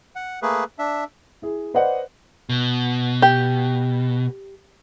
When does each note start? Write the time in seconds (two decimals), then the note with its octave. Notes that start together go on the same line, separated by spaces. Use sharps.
0.16 F#5
0.42 A3 A#3 G#4 B4
0.79 D4 E5
1.42 E4 G#4
1.74 B4 C5 D5 D#5 F#5
2.49 B2
3.22 G4